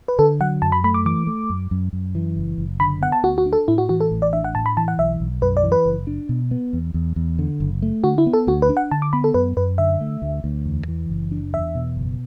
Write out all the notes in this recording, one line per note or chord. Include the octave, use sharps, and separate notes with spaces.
B4
D3 A4
F#3 F#5
F#2 A5
B5
A3 B5
D6
E3 D6
A3
F#2
F#2
F#2
E3
F#1
F#1
D3 B5
B3 F#5
A5
D2 F#4
F#4
D4
A4
A2 E4
F#4
E3 F#4
A4
A1
D5
D4 E5
F#5
A2 A5
B5
E3 A5
F#5
B1 E5
B1
F#2 B4
D5
E3
B4
F#1
D4
B2
B3
E2
E2
E2
D3
F#1
A3
D3 F#4
E4
B3
A4
D2 F#4
B4
D4
F#5
D3 A5
D6
B3 B5
A4
F#2 B4
F#2 B4
D3 E5
A3
D2
D2
E2
E3
F#1
D4
E2 E5
B2
F#1